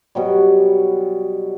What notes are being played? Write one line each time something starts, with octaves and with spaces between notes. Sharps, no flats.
B2 F#3 G3